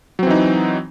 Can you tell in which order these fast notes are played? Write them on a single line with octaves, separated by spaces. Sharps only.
F#3 C4 E3 D#4